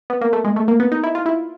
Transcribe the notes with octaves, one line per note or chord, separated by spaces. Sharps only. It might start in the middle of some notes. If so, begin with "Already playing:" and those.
B3
A#3
A3
G#3
A3
A#3
B3
D#4
E4
F4
E4